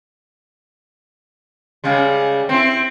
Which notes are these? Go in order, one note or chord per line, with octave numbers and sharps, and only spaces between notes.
C#3 G3 G#3
C4 E4